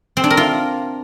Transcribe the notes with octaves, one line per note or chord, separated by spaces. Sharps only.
C4
D4
A#4
F4